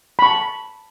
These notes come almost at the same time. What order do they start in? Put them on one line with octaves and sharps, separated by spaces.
B5 C#6 A5